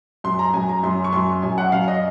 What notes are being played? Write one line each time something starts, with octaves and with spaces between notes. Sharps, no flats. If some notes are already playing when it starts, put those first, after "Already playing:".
F#2 C6
A#5
F#2 G#5
A#5
F#2 C6
C#6
F#2 C6
F#2 G#5
F#5
F#2 F5
D#5